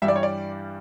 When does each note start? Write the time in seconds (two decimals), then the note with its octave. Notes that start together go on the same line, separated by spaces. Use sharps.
0.02 G2 E3 G3 E5
0.08 D5
0.16 C#5
0.23 D5